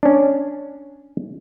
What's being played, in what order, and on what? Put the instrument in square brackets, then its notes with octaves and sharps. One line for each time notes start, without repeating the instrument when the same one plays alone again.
[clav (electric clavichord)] C#4 D4